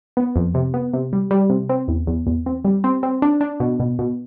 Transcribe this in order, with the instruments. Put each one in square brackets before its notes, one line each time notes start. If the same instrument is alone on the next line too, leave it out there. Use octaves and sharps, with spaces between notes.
[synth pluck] B3
F2
C3
B3
C3
G3
G3
C3
C4
E2
E2
E2
C4
G3
C4
C4
D4
D4
B2
B2
B2